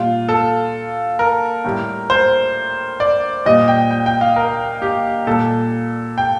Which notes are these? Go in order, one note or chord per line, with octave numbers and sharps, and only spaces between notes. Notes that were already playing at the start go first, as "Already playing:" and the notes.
Already playing: A#2 G3 F4
A4
A#4
A2 G3
C5
D5
A#2 G3 D#5
G5
G5
G5
F5
A#4
G4
A#2 G3 A4
G5